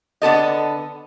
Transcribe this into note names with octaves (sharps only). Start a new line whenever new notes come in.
D3 B3 A4 D#5